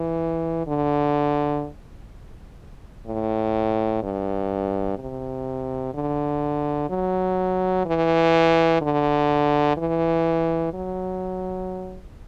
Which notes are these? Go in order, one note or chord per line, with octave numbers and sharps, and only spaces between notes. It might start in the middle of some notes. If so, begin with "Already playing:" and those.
Already playing: E3
D3
A2
G2
C3
D3
F#3
E3
D3
E3
F#3